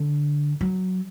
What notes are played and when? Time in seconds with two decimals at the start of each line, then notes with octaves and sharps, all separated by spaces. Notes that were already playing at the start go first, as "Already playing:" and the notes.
Already playing: D3
0.61 F#3